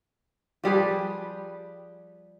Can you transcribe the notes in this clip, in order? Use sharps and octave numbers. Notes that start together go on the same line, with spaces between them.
F3 G3 G#4 B4